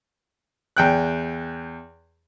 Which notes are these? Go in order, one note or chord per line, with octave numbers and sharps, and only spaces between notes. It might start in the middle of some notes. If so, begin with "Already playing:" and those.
E2 G5 F#6